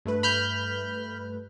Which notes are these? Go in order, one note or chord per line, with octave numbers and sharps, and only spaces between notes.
G2 A3 B4
B5 F6 G6